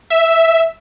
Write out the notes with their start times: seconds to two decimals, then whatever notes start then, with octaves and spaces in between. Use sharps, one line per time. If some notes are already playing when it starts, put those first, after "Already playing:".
0.10 E5